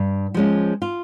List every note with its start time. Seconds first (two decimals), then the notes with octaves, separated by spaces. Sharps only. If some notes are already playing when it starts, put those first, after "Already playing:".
Already playing: G2
0.34 F3 G#3 C#4
0.82 F4